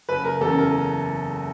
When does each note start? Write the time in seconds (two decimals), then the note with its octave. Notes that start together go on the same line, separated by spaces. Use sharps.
0.09 F#1 B4
0.24 A#4
0.41 E2 A4
0.45 C#3
0.58 A#4